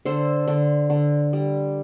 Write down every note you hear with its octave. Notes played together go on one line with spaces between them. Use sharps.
D3 A4 C5
D3
D3
G3